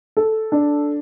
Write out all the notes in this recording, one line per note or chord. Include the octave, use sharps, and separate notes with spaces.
A4
D4